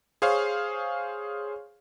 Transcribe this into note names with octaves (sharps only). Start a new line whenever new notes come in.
G#4 C5 C#5 F5